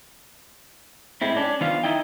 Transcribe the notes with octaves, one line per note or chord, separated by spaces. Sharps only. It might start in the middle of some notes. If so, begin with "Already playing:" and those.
A2 G#3 C4 E4
C#4 D4
D#3 B3 D4 F4 C5 F5
D#4 E4 D#5 G5